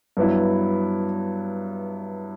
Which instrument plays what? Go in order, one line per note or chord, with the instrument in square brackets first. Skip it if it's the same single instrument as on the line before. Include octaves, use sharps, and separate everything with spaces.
[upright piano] G2 F#3 B3 E4